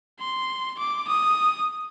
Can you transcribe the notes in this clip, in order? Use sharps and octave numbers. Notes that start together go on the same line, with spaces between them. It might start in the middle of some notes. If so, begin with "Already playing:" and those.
C6
D6
D#6